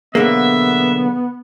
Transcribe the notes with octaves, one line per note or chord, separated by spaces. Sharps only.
B1 D3 A#3 B3 G#4 E5